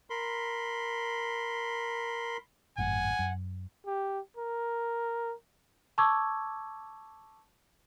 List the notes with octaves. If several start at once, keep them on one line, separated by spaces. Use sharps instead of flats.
A#4 B5 C6
G#1 F#2 A2 F#5 G#5
F#2
G4
A#4
A5 C#6 D6 E6 G#6